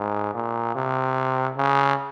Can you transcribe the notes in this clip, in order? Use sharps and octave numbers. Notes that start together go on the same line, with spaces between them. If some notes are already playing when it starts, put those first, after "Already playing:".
Already playing: G#2
A#2
C3
C#3